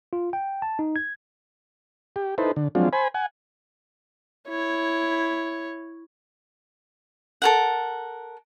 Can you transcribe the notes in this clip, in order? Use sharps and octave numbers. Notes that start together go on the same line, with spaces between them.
F4
G5
A5
D#4
G#6
G4
D#4 E4 A4 B4 C5
D3
F3 F#3 G#3 C4 D4 F4
C5 G#5 B5
F#5 G#5
E4 C#5
A4 A#4 F#5